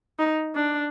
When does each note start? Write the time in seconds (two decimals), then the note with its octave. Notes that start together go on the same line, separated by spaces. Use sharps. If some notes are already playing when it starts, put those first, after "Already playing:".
0.19 D#4
0.55 D4